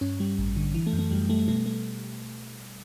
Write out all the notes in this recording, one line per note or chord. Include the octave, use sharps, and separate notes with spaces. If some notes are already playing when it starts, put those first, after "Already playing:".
G2 C#4
G3
A1
D3
E3
A3
F#2
A3
F#2 G3
G3 A3
B2 A3
A3